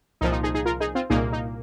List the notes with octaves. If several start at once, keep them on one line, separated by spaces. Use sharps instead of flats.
C2 A#2 F3 D#4
D#4
D#4 G#4
D#4 G#4
F4 A#4
D#4 G#4
C4 F4
C2 A#2 A#3 D#4 G#4
D#4